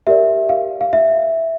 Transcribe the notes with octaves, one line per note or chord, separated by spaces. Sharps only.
G4 A#4 D5 E5
F5
F5
E5